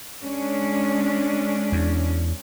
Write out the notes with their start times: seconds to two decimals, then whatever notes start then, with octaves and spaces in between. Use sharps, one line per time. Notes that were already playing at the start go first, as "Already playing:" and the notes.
0.24 G#3 C#4 D4
1.72 E2